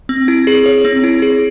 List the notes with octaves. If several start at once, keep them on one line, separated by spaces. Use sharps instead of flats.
C4
E4
G#4
C#5
C4
E4
G#4